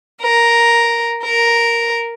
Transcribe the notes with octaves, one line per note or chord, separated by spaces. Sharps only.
A#4
A#4